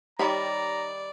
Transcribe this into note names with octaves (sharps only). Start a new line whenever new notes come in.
D#3 G3 D#4 G4 C#5 D5 A#5 B5